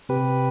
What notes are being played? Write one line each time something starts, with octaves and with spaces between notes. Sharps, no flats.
C3 G4 B4